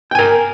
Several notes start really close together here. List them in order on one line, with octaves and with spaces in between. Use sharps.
G5 G#5 A#4